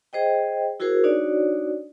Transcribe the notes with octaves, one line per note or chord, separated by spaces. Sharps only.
G#4 C5 D#5 G5
E4 F#4 G#4 A#4 C5
D4 D#4 F#4 C#5 D5